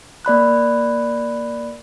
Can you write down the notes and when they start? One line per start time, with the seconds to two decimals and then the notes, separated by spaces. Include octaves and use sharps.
0.25 A#3 D5 B5 F#6